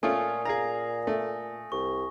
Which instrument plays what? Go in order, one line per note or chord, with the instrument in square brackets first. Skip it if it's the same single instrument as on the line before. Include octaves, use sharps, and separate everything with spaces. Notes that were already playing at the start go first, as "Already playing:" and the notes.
[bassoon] A#2 [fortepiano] A3 C#4 F4 [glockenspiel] G#5 D#6
[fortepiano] G#4 F5 A#5 [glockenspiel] A#6
[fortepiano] A3
[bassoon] C2 [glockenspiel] C#6